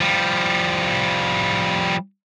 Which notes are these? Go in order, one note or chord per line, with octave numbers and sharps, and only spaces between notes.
F3 G3